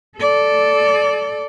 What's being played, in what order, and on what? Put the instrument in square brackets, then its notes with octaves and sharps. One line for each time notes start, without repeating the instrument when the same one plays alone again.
[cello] A4 D5